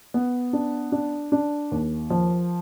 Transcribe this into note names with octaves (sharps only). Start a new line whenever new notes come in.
B3
D4
D4
D4
D#2
F3